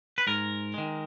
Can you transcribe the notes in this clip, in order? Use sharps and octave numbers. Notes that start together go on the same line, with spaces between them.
B4
G#2 A#4
D#3 G#3